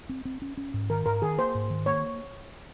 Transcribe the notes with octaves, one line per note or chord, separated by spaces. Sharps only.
C4
C4
C#4
C#4
G#2
D#3 A#4
G#2 A#4
D#3 G#4
A#3 C5
G#2
D#3
A#3 C#5